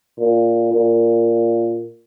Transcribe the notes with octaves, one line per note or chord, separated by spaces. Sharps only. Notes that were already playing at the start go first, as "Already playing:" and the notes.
A#2
A#2